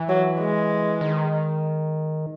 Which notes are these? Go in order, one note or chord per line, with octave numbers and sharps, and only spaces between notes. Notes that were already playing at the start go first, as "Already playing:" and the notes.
Already playing: E3
F#3
G#3
D#3